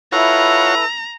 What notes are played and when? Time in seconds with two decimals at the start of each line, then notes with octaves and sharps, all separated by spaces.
0.12 E4 F4 A4 B4 C#5 F#5 A#5